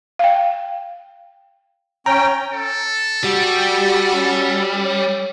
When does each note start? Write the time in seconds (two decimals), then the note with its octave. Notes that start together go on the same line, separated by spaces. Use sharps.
0.19 F5 G5
2.06 C#4 G5 A#5
2.53 A4
3.24 G3 F#4 G4
4.13 C#4
4.85 C#5